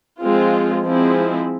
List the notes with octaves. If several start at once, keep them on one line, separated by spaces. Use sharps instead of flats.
F3 G#3 C4 F4
F3 G#3 C4 E4